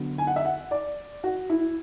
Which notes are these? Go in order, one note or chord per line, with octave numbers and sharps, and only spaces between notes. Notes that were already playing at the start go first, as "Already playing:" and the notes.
Already playing: D3 F#3 B3
G#5
F#5
E5
F#5
D5
F#4
E4